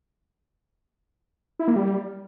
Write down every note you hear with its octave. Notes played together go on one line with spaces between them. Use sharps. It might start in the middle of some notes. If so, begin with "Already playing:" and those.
E4
A#3
G3